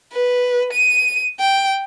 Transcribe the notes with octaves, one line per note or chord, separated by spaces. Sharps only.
B4
D#7
G5